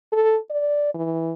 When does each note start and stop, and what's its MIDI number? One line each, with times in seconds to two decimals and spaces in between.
0.13 0.37 69
0.51 0.94 74
0.95 1.34 52